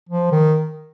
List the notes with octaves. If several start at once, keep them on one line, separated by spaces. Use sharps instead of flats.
F3
D#3